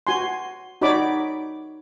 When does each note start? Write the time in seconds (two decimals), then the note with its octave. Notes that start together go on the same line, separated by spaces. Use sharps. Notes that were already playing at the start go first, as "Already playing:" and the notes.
0.07 F#4 G#5 C6
0.81 D#4 F#4 C#5 D5 B5 D6